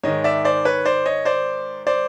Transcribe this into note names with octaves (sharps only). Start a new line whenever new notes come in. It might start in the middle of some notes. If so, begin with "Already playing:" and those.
G#2 D#3 G#3 C#5 D#5
D5 E5
C5 D5
B4 C#5
C5 D5
C#5 D#5
C5 D5
C5 D5